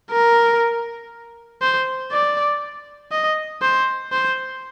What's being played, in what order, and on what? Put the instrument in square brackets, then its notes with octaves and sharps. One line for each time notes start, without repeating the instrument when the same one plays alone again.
[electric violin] A#4
C5
D5
D#5
C5
C5